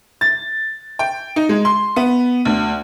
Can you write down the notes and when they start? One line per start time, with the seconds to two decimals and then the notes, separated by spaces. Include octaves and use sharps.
0.21 A6
0.99 G5
1.36 D#4
1.49 G#3
1.65 C6
1.96 B3
2.45 D2